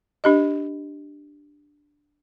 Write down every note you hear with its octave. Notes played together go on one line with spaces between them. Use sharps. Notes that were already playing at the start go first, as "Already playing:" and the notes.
D4 G4 D#5